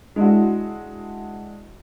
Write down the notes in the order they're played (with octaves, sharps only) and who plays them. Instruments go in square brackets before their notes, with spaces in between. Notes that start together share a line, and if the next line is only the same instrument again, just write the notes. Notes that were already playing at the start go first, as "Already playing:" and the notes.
[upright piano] G#3 D4 E4 F#4